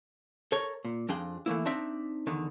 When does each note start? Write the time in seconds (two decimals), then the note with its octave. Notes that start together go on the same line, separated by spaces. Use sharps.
0.52 A4 A#4 C#5
0.85 A#2
1.09 F2 F3 D4 G#4 G5
1.46 E3 A3 A#3 E4
1.65 C4 D4 D#4 D5 E5
2.27 E2 D3 D#3